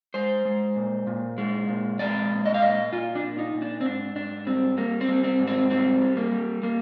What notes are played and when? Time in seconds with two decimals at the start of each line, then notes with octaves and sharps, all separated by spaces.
0.14 G#3 C5
0.45 G#3
0.76 A#2
1.07 A#2
1.38 G#3
1.68 A#2
1.99 G#3 D5
2.31 A#2
2.46 D#5
2.54 F5
2.61 A#2 D#5
2.93 A#2 F4
3.15 D4
3.23 A#2
3.39 D#4
3.54 A#2
3.62 D4
3.81 C4
3.85 G#2 D4
4.16 G#2 D4
4.47 G3 C4
4.77 G3 A#3
5.01 C4
5.08 G3
5.24 C4
5.40 G#2
5.47 C4
5.70 G3 C4
6.01 G3
6.17 A#3
6.32 G3
6.63 G3 A#3